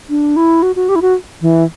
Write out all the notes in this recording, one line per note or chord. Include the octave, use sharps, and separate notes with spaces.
D4
E4
F#4
F#4
G4
E4
F#4
E3